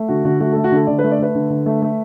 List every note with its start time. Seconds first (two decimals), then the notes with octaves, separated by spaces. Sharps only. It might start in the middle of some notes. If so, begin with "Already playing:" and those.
Already playing: A3
0.08 D3 F#4
0.25 D3 F#4
0.40 A3 F#4
0.52 A3 A4
0.64 F#4
0.72 D3 A4
0.87 D3 D5
0.99 B4
1.04 A3
1.11 D5
1.19 A3 B4
1.35 D3
1.50 D3
1.66 A3
1.82 A3